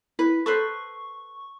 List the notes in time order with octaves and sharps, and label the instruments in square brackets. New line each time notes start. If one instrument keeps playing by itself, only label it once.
[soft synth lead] E4 [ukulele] B4
[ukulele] A4 B4 C5 [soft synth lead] C#6